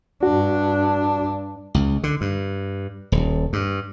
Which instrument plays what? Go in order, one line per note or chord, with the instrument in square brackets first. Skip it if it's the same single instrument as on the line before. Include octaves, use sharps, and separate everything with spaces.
[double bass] G2 D4 [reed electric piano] F#4
[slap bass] C#2
D3
G2
D#1
G2